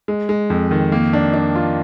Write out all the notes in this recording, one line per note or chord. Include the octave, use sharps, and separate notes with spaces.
G#3
G#3
F2
D#3
A#3
D4
D4
F4